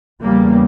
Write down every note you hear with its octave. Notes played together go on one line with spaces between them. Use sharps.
E2 C#3 G3 A#3